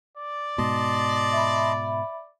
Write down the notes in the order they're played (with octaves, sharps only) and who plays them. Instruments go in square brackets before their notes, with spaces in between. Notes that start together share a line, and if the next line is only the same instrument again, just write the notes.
[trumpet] D5
[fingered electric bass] G#2 B2 [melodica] D#5 A5 C6
[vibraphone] E5 B5